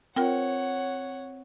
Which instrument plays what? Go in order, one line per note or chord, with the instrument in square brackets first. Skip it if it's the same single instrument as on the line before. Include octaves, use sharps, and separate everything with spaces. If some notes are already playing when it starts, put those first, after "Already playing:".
[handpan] C4 [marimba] F4 A#4 G5 [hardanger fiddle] C#5 F#5